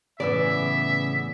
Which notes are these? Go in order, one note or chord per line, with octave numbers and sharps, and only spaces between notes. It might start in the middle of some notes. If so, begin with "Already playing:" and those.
A2 C#3 E3 B3 D5 E5 E6